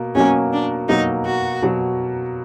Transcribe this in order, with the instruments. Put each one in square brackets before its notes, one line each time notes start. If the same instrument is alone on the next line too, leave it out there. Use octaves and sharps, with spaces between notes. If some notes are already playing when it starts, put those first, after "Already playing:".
Already playing: [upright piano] B2 A#3
[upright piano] B2 F#3 A#3 [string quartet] C#4
[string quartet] D4
[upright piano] B2 F#3 A#3 [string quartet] D#4
[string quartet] F#4
[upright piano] B2 F#3